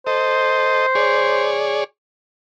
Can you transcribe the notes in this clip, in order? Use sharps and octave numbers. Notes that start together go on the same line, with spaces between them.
A4 C5 D#5
G#4 C#5 D5